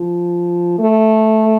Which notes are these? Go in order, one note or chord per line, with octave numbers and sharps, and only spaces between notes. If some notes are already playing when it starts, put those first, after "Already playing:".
Already playing: F3
A3